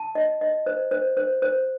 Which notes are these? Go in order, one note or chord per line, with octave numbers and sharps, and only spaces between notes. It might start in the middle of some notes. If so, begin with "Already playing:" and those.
Already playing: A5
D#5
D#5
C5
C5
C5
C5